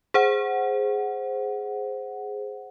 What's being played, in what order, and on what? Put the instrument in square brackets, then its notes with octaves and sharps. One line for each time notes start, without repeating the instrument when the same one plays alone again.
[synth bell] G#4 C5 F#5